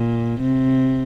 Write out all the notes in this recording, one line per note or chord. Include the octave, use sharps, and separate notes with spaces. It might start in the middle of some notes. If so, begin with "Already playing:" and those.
Already playing: A#2
C3